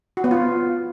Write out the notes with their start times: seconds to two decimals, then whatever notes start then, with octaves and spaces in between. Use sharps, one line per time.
0.17 F#4
0.24 B3
0.31 F4